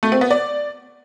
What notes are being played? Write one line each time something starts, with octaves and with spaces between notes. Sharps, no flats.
A3
C4
B3
D5